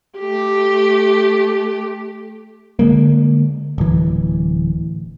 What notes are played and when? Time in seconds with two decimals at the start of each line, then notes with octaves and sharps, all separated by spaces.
0.19 A3 G4
2.79 D3 G#3 A#3
3.78 D1 E3